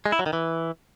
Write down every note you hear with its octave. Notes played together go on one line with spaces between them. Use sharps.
G#3
E4
F#3
D#3
E3